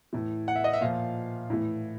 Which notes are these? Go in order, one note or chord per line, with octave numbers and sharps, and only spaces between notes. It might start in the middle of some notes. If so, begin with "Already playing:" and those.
A2 E3
F#5
E5
D#5
E5
A#2 F3 F5
A2 E3